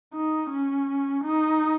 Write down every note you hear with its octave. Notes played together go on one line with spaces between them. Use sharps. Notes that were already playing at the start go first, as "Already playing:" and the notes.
D#4
C#4
D#4